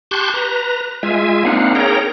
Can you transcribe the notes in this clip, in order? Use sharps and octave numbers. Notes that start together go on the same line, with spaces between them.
G4 A5 C6 C#6 F#6 G6
B4 A#5
G#3 F4 E5 G#5
A#3 C4 D4 D#4 F5 F#5
G#4 A#4 C#5 G5 A#5